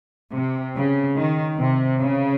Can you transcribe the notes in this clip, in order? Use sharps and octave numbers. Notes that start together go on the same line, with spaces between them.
C3
C#3
D#3
C3
C#3